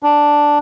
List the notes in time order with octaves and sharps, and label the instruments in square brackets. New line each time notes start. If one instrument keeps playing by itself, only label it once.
[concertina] D4